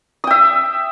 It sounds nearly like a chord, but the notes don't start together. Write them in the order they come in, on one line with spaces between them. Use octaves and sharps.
D#6 G5 E5